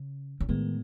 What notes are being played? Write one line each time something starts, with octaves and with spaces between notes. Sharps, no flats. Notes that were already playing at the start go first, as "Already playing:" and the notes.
Already playing: C#3
C#3
A2 D#3 G#3 B3